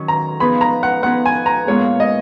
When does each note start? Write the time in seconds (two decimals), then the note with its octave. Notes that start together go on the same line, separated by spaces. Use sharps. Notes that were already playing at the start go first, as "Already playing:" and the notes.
Already playing: D#3 F#3 C#4
0.08 A#5
0.40 F3 B3 D#4 G#4 B4 B5
0.61 A#5
0.83 F#5
1.03 F3 B3 D#4 G#4 B4 F#5
1.26 G#5
1.46 A#5
1.67 A#2 G#3 B3 F4 G#4 C#5
2.00 D#5